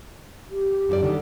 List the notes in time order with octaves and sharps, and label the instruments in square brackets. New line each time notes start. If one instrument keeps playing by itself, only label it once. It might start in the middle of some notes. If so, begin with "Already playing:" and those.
[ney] G4
[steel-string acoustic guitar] F#2 F#4 D5
D3 D#3 G3